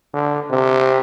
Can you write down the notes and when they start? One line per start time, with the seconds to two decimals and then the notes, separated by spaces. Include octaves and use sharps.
0.14 D3
0.50 C3